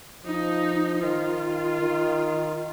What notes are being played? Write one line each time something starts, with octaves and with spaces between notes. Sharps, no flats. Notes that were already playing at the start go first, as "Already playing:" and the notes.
F3 D#4
D#3 F4
D#3